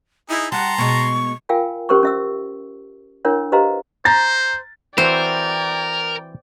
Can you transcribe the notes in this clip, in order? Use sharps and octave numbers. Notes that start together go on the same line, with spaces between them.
D#4 E4 G#4
G3 F#5 A5 A#5 C6
B2 G#3 C#6
F4 A#4 F5 G5 G#5
C#4 G4 A#4 C5 C6 C#6
C#4 E5 E6
D4 E4 A#4 C#5 F#5
G4 B4 C5 D#5 F5 A#5
C5 A#5 A6
E3 C4 F#4 A#4 C5 D5 G5